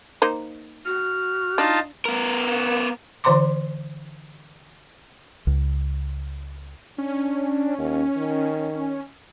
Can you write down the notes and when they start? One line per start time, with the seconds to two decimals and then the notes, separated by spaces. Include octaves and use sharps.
0.22 A#3 D#4 C5
0.86 F#4 F6
1.58 D4 D#4 F4 A5
2.05 B3 A#4
3.24 D3 E3 C5 A#5 C6 D6
5.47 C#2
6.98 C#4 D4
7.78 D#2
8.17 D#3